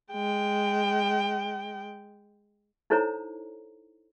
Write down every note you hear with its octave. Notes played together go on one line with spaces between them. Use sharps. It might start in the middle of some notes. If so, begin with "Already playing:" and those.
G#3 G5
D#4 E4 A4 C5 C#5 A#5